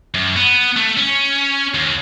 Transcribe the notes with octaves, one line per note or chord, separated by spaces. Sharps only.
F#2
B3
A3
C#4
D#2